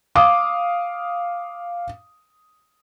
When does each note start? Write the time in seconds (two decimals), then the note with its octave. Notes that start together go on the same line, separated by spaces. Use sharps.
0.15 F5 D6 D#6